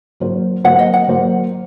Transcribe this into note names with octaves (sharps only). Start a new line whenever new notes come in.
F#3 A#3 F#4 C5
F#3 A#3 F#4 C5 F#5
D#5
F#5
F#3 A#3 F#4 C5